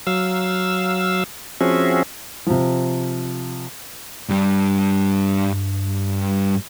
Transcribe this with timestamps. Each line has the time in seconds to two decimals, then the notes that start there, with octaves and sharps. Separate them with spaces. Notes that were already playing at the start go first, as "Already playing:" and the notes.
0.07 F#3 F5 E6
1.61 F3 C4 C#4 F#4 G#4 E5
2.46 C3 F3
4.29 G2 G3